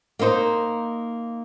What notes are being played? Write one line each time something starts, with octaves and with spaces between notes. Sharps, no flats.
A#3 D#4 C5